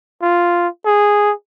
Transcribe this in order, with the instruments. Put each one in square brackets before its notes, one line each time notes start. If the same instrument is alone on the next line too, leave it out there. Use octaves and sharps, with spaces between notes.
[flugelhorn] F4
G#4